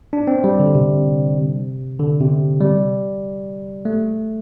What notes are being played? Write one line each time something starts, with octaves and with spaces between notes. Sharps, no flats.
D4
C4
G3
D3
C3
D3
C3
G3
A3